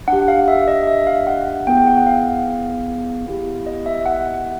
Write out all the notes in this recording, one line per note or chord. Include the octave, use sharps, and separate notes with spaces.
D4 G4 F#5
F5
E5
D#5
E5
F5
F#5
F#5
B3 E4 G#4 G5
G5
F#5
F#5
F5
B3 E4 G4
D#5
E5
F#5